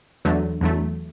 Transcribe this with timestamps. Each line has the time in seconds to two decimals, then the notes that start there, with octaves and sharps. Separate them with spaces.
0.25 E2 D3 F#3 A3
0.61 E2 D3 F#3 A3